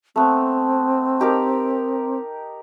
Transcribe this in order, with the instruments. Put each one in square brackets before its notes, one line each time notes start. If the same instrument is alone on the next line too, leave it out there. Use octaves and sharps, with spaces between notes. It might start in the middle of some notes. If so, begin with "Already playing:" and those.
[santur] A3 B3 [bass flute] C4
[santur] D#4 G4 A#4